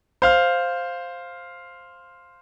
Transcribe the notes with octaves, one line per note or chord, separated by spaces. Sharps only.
C5 F5 F6